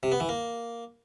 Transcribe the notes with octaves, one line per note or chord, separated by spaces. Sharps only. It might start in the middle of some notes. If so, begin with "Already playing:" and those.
C3
B3
E3
A#3